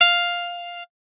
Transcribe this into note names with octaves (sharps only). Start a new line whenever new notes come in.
F5